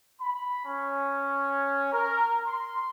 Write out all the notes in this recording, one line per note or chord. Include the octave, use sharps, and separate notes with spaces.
B5
C#4
A#4
C6